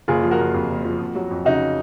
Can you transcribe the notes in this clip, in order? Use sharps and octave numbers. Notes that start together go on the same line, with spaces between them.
F#1 F4 G#4
F3
F#4 A#4
F#1
F2
F#1
F3
F2
F#3
F2
C#3 D#4 F#4